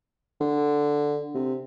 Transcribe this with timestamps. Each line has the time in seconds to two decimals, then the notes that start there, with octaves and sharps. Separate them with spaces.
0.41 D3
1.35 C3